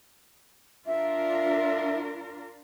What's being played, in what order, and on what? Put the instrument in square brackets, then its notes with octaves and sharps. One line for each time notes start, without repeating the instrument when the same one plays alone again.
[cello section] D4 F4 A#4 [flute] E5